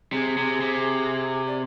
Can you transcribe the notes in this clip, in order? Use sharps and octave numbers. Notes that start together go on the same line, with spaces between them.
C3 G#4
C3
C3
D5